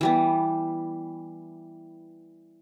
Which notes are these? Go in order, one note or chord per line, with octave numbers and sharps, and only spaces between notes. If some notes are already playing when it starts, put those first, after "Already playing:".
E3 G3 B3